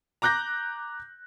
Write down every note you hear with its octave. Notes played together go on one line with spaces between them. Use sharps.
A#5 D6 F#6 G6 A#6